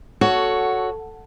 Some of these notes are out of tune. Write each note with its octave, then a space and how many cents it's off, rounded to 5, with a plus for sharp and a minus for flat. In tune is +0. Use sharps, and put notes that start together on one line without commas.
F#4 +0 A4 +0 C#5 +10